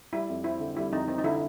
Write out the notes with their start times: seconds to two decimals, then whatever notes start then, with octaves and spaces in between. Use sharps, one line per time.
0.13 G3 E4
0.29 F2
0.44 C4 E4
0.60 D3
0.77 G3 E4
0.92 F2 D#4
1.08 C4 D#4
1.19 D#4
1.24 D3 E4